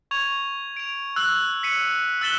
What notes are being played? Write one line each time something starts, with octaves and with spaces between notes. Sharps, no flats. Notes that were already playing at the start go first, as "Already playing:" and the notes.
C#6 G#6 F7
D7 F7
E6 F#6
B6 C#7 D#7
E6 F#6 A6 B6 E7 G7